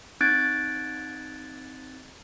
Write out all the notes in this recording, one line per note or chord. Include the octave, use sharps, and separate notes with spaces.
C4 D#4 F#6 G#6 A6 D7